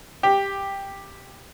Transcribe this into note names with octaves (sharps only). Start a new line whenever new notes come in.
G4